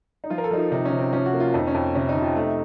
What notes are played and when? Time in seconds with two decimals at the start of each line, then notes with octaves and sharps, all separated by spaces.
0.24 D#4
0.30 F3 F4
0.38 A#4
0.44 A4
0.51 F3 D#4
0.58 F4
0.72 C3 D#4
0.85 C#4
0.92 C3
0.99 C4
1.13 F3 C#4
1.26 F#4
1.33 A#3
1.40 F4
1.54 F2 D#4
1.67 C#4
1.75 F2
1.95 C3 C#4
2.09 D#4
2.15 C3
2.22 F4
2.36 A3 D#4